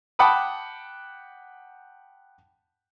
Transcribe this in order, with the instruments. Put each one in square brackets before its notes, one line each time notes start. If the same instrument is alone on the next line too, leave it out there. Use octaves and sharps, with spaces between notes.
[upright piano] F#5 G5 A5 B5 D6 D#6